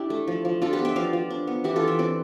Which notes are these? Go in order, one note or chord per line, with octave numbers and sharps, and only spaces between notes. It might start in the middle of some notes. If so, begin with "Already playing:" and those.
Already playing: D4 E4 G4
A3
F3
F3
D4 F4 A4
G4 B4
B3
E5 G5
F3 D5 F5
F3
D4
B3
E3 E4 G4
F4 A4
E3
E5 G5
C4 B4 D5